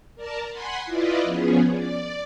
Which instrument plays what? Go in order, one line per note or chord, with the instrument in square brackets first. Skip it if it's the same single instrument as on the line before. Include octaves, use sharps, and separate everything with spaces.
[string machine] A#4 D5 A5 A#5
F#5 G#5 B5 C6
E4 F4 B4 D5 D#5
F3 B3 C#4 G#4
D5